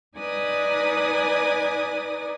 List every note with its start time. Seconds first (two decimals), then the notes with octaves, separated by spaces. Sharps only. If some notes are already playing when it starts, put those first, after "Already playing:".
0.18 D#4 B4 D5 G#5 D6 D#6